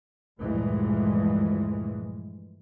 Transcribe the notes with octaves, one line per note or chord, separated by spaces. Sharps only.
D2 G2 A#2 E3 F3 G#3